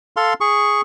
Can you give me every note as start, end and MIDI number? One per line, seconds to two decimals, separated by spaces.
0.17 0.34 69
0.17 0.34 77
0.17 0.34 84
0.41 0.81 68
0.41 0.81 85